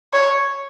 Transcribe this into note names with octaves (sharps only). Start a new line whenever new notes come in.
C#5